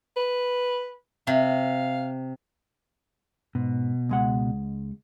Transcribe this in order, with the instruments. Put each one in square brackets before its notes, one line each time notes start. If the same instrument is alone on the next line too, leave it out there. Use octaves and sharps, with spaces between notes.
[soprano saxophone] B4
[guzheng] C3 [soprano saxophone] F5
[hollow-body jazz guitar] G#2 [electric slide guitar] B2
[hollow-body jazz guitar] C#2 G#3 F#5